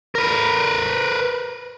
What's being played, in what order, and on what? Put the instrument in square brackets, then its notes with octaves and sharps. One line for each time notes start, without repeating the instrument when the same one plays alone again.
[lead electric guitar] A#4 B4